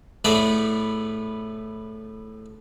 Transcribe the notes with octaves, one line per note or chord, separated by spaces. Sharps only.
A2 A3 B3 G#4 B4 D5